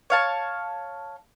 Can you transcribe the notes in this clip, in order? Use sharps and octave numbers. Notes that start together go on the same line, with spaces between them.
C#5 F5 A5